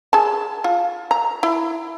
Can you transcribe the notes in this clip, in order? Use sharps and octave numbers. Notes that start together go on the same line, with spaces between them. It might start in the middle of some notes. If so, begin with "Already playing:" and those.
G#4 A5
F4
A#5
E4